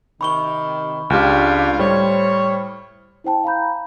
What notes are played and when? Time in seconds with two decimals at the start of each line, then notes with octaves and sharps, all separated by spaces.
0.21 C3 D#3 B5 C#6 G7
1.10 C#2 D4 F4 G4 F6
1.79 A2 G3 C5 C#5
3.24 E4 C5 G5 A5
3.44 F5 A#5 B5 G6